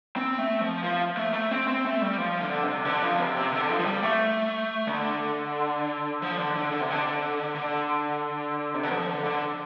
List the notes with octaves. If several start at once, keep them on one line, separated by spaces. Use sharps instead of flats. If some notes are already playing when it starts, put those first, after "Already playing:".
C4
A3
F3
F3
A3
A3
C4
C4
A3
G3
F3
D3
C3
D3
F3
C3
C3
D3
F3
F3
G3
A3
D3
F3
D3
D3
D3
C3
D3
D3
C3
D3
F3
D3
D3